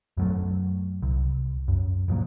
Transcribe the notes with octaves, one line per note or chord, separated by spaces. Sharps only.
F#2 F#3 A3
C2
F#2
E1 G2 F3 A#3